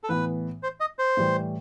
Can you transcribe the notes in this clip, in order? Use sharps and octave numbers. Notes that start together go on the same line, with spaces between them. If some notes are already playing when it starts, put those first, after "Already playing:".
A4
A2 E3 B3 B4
C5
D#5
C5
A2 E3 G3